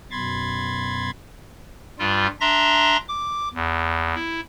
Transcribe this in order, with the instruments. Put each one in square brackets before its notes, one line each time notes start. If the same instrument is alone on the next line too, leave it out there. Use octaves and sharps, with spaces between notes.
[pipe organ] F#2 B2 B5 C6 G#6 A6
G2 G3 F4
D4 E5 A#5 C6 A#6
D6
E2
E4